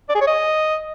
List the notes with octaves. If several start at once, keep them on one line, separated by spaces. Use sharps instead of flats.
D5
G#4
C#5
D#5